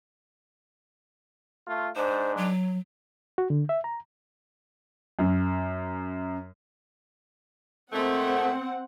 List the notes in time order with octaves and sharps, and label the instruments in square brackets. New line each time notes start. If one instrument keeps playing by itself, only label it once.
[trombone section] A3 F4
[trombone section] G#2 D4 [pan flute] C5
[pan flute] F#3
[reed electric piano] F#4
D3
E5
A#5
[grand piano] F#2
[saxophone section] A#2 G#3 A3 [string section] C4 F#5